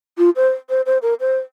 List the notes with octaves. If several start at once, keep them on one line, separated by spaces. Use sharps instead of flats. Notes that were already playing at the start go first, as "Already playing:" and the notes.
F4
C5
C5
C5
A#4
C5